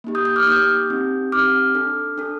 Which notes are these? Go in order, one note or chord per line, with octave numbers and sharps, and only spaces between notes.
A#3 D#4 G4
D#6 G6
D#6 G6
D6 F6
A#3 D#4 G4 D#6 G6
C4 D#4 G4
C4 D#4 G4 D6 F6
D4 A4
D4 A4